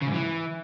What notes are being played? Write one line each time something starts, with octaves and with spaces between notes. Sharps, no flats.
C#3
G#2
E3